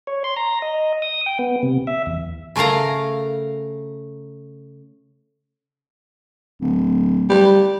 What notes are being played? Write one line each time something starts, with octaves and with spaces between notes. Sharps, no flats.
C#5
C6
A#5
D#5
D#6
G5
B3
C3
E5
E2
C#3 A3 A#4 F5 A#5
D1
G3